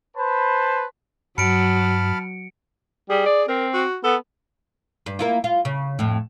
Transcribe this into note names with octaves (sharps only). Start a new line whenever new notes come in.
B4 C5 A5 B5
G2 F#3 A5 B5 F6 C#7 D7
G3 G#4
D5
C4 A#4
F#4
B3 A4
G2
A#3 E4 F4
F4
C#3
F2 A2